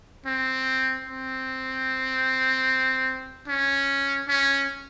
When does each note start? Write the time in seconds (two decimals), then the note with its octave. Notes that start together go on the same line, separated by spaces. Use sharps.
0.26 C4
1.07 C4
3.48 C#4
4.28 C#4